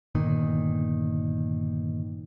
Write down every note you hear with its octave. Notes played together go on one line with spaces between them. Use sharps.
G1 A#2 D#3